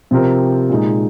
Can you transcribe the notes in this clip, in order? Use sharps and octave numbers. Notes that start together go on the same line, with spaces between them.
C3 F3 C4 G4 A#4
A#2 G#3 D#4